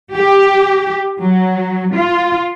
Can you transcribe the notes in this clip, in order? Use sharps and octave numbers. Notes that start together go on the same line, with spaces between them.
G4
F#3
F4